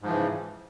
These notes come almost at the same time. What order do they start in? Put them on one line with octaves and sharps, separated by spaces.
G#2 F3 E3 C#3